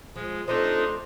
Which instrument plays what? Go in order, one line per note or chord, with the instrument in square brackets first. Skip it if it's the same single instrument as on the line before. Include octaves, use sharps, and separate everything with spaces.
[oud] F3 [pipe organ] G#3
[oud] F3 A3 C4 [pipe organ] D4 D#4 D#5 [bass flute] A4 [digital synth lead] C5